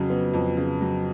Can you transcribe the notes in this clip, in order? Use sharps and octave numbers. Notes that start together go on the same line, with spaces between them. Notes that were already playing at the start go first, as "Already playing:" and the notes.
Already playing: F2 C#3 F#3
B3
F2
C#3
F#3